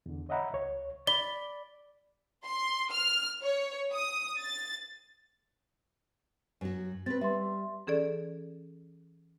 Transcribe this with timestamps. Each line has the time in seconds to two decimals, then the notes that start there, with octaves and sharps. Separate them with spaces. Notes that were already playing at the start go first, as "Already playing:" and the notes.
0.06 E2 D3
0.29 C#5 D#5 E5 F#5 A#5 B5
0.53 C#2 C#5
1.07 D5 B5 G7
2.45 C6
2.91 F6
3.43 C#5
3.94 D#6
4.38 A6
6.61 F#2 F#4
7.06 C4 B4 A6
7.21 G3 E5 C6
7.87 E3 C#4 G#4 A4 D5